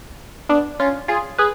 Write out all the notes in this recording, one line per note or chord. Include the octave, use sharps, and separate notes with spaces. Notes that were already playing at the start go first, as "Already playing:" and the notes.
B3 D4
C#4 F4
F4 G#4
G#4 B4